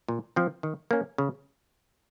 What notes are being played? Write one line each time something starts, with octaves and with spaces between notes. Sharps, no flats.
A#2
F3 C4
D#3
A#3 C#4
C#3